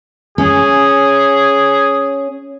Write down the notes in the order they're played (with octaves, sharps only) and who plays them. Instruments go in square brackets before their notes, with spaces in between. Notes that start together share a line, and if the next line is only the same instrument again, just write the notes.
[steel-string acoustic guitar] C#4 [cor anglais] G#4